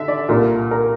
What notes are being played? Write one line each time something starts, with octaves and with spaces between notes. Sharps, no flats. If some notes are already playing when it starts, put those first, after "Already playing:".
Already playing: D3 E5
D5
C2 A#2 A#4
A#4